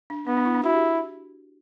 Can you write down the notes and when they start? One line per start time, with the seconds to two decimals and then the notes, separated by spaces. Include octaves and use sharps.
0.10 D4
0.27 B3 D4
0.37 D4
0.45 E4
0.55 D4
0.63 E4 F#4
0.74 G4